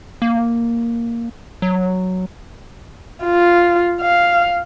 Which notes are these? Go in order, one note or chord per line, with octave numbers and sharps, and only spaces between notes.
A#3
F#3
F4
F5